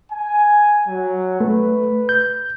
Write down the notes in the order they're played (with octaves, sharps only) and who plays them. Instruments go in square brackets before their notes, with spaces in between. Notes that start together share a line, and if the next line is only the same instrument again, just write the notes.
[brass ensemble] G#5
F#3
[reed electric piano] A3 [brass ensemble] B4
[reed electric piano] G6